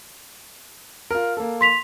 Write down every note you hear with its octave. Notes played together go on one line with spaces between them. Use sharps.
F4 A#4
A#3 A4
C6 B6 F7